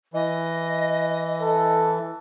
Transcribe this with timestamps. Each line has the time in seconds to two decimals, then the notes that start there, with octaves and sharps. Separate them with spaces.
0.14 E3 D#5
1.41 A4